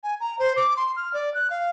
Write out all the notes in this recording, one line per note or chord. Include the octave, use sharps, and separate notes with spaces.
G#5
A#5
C5
D6
C6
F6
D5
F#6
F5